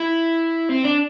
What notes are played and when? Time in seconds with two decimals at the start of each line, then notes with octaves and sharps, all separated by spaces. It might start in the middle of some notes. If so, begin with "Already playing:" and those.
Already playing: E4
0.70 C4
0.85 D4